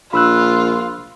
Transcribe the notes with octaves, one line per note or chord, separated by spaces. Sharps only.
A#1 F4 B5 E6 F#6